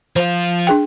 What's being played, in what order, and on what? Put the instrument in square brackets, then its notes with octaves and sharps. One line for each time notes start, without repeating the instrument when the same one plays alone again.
[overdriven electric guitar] F3 F4 [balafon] C5
[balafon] D4 G#4 G5